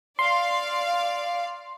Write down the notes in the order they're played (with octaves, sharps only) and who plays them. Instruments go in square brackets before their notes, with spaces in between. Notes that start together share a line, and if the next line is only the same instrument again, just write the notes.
[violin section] D5 F5 [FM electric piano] C6